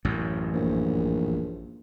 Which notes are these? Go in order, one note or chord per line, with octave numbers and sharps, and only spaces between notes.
A1 F#2
A#1